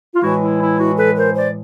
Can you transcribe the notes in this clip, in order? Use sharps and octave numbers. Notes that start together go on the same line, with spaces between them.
F4
A2 E3 G#3 E4 F#4
E4
E4
E4 F#4
A4 B4
A#4 C5
C5 D5